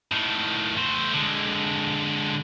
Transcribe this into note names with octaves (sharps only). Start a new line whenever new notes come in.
A2 D#3
A3 C5
D3 G#3